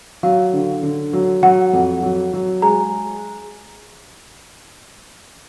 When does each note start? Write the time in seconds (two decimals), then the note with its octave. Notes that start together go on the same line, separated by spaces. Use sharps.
0.23 F#3 F5
0.53 D3
0.83 D3
1.13 F#3
1.43 F#3 F#5
1.73 F2
2.03 F#3
2.33 F#3
2.62 G#3 A#5